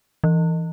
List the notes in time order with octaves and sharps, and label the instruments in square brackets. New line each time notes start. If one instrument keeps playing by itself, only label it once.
[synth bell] E3